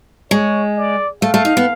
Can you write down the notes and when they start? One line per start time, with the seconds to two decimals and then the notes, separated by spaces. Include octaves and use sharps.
0.31 G#3 C#5
0.77 D5
1.22 A3 F5
1.34 A3
1.45 D#4
1.57 B3